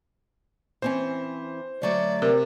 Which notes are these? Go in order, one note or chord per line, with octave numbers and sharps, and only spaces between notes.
E3 C4 C#4 C5
D2 F#3 A3 D5
C3 A#4